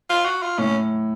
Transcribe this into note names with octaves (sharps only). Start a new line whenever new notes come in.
F4
F#4
F4
A2 C#4